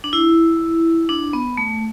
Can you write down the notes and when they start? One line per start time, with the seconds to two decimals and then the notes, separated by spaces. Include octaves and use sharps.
0.04 D4
0.13 E4
1.09 D4
1.33 B3
1.57 A3